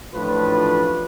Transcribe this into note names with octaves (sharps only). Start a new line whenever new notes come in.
A1 A2 F3 D4 F4 B4